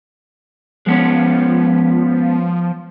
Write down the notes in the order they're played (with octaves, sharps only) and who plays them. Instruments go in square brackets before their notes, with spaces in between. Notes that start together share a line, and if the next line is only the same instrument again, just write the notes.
[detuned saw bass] F3 [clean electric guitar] G#3 B3 C#4